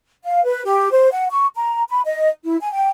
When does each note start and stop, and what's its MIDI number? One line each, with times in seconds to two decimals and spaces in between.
0.24 0.44 77
0.44 0.62 71
0.65 0.91 67
0.92 1.10 72
1.12 1.27 78
1.31 1.46 85
1.55 1.82 82
1.88 2.01 83
2.05 2.29 75
2.44 2.57 64
2.60 2.71 80
2.72 2.89 79